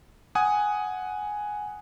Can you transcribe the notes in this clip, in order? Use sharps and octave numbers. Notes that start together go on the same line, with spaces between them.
F#5 G#5 D#6